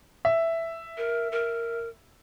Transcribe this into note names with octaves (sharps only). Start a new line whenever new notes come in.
E5
A#4
A#4